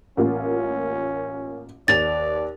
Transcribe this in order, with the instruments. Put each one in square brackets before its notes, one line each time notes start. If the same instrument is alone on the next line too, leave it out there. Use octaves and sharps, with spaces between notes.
[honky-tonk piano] A1 A#3 F4 [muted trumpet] C#4
[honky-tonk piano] D#2 F7 [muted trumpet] D5 [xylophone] A6